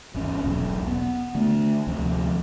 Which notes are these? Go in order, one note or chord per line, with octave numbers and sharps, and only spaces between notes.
G#1 E2 C#4
E1 B1
B3
D3 A3
D2 C3 F3 C4